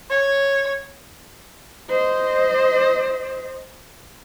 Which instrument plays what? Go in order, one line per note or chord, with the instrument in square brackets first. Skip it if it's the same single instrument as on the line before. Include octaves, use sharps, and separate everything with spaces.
[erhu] C#5
[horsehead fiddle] C5 D#5